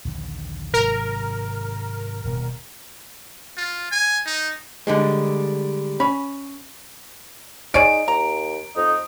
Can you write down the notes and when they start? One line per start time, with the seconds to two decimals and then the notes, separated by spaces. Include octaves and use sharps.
0.05 A#1 D#2 D3
0.74 G#1 C3 F#3 A#4
2.25 D#1 B2 G3
3.57 F4
3.91 G#5
4.26 D#4
4.87 D3 G3 G#3
6.00 C#4 B5
7.74 D#4 G#4 C#5 D5 D7
8.08 D#2 A#5
8.76 F2 D#4